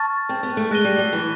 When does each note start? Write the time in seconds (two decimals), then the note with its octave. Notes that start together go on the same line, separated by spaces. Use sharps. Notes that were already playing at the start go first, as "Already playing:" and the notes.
Already playing: A5 C#6 F6 A6
0.29 C4
0.43 B3
0.57 A3
0.71 G#3 F#6 A#6 D#7 G7
0.84 G3
0.99 F#3
1.13 E3